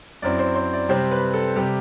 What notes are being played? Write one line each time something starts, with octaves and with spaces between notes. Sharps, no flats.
F#2 F#3 C4 E4 D5
C5
C5
D5
C3 G3 C4 C5
B4
A4
C3 G3 G4